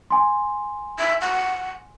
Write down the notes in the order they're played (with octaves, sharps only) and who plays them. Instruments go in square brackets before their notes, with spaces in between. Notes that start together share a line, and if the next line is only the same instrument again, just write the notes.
[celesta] G#5 C6
[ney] E5
F#5